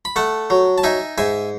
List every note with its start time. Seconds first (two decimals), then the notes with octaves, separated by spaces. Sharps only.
0.05 B5
0.16 A3 F#5 A5
0.50 F#3
0.78 A5
0.83 D#4 E5 G#5
1.18 G#2 E5 G#5